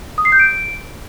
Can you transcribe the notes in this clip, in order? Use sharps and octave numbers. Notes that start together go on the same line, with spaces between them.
D#6
C7
G6
D7